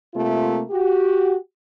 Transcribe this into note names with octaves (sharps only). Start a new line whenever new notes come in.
C3 A3 A#3 F4
F#4 G4